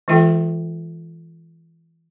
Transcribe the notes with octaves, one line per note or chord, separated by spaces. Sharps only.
E3 G#3 F4 A4 E5 G5